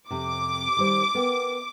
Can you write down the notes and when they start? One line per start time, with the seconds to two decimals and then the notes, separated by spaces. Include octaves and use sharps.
0.11 F2 C3 D6
0.77 D#3 G3 C5
1.15 B3 A#4 G5